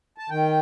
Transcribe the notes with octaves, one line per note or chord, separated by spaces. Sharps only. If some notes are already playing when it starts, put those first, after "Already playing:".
A5
D#3 G5